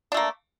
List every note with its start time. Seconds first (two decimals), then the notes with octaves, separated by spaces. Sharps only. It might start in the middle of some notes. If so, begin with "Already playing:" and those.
0.12 D4
0.14 A3
0.17 A#3